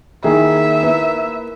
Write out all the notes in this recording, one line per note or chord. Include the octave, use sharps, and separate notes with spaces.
D#3 A#3 E4 G#4 E5
A#3 E4 B4